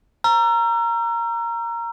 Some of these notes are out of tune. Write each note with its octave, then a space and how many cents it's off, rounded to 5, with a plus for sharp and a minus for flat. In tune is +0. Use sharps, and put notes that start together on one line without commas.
A#5 +0 E6 +45